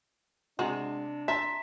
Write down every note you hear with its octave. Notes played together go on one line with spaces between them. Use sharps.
C3 G#3 D4 F#4
E5 A5 A#5 C6 B6